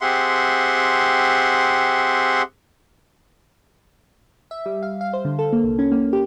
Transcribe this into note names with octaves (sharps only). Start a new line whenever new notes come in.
C4 G4 G#4 E5 F#5 C6
E5
G3
F5
F5
C5
D3
A4
A#3
C2
C#4
A#3
G4